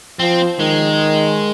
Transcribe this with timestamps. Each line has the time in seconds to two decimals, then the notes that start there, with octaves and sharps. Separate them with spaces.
0.19 F3 C4
0.59 D#3 G#3